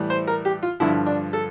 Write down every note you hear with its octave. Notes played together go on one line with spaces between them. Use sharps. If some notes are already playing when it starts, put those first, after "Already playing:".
Already playing: A2 E3 G3
C5
A#4
G4
F4
G2 D3 F3 E4
D4
A4